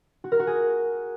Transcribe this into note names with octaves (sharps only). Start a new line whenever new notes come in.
F#4
A#4
F#4
G#4